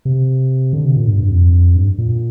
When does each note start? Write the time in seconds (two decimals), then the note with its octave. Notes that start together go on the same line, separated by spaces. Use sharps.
0.05 C3
0.73 D3
0.85 C3
0.96 A#2
1.08 G2
1.19 G2
1.30 F2
1.76 G2
1.98 A#2